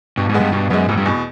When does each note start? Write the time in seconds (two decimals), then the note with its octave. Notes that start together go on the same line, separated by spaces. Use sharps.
0.17 G2 B2
0.29 G#2
0.34 G#3 B3
0.40 G2
0.52 G2 B2
0.70 F#2 G#3 B3
0.88 F1 G#2
0.97 G2
1.06 E2 B2